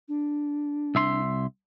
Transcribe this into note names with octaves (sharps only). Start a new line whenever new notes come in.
D4
C2 E5 C6